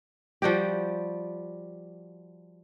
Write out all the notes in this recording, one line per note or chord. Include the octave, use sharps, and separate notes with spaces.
F3 G3 F#4 G4